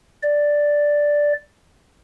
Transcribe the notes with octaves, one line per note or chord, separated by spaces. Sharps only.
D5